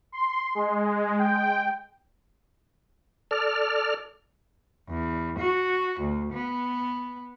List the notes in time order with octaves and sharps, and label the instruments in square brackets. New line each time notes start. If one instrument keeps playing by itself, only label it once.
[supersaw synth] C6
G#3
G5
[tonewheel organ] A4 D5 F6
[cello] E2
F#4
D2
B3